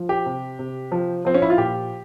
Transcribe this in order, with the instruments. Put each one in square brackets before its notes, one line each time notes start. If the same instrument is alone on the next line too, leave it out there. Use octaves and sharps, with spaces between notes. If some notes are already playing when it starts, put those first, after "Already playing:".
Already playing: [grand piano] F3
G4
C3
C3
F3
F3 C4
C#4
E4
F4
A#2 G4